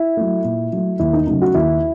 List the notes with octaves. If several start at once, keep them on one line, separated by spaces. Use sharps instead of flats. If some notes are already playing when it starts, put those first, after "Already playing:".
Already playing: E4
F#3 A3
A#2
F#3 A3
D#2 E4
D#4
C#3 F#3 A3 D#4
F#4
D#2 E4